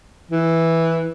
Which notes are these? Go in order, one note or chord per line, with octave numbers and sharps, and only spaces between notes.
E3